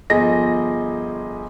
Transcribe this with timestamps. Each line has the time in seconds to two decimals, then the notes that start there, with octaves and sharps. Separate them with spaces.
0.10 G1 F3 G#4 D#5 A#6